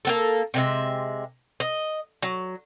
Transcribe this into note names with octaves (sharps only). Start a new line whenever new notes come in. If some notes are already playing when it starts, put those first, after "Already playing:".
A#3 B3 A4
C3 G#3 E5
D#5
F#3